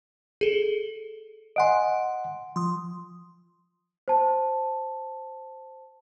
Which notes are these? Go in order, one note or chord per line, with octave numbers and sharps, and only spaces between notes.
G#4 A4
D#5 F#5 G#5 C6 D7
F3 C6 D#6
C5 A5